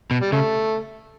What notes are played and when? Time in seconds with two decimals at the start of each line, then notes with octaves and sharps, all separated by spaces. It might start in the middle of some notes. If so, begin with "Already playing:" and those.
0.11 B2
0.21 G3
0.32 C#3 A3